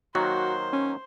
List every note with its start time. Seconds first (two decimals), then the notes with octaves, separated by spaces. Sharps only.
0.15 D#3 F#3 A#3 F#4 C5
0.73 C#4